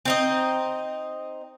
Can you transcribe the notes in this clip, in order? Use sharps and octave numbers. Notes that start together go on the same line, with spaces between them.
C4 D#4 D#5